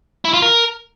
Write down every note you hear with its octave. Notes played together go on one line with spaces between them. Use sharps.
E4
F4
A#4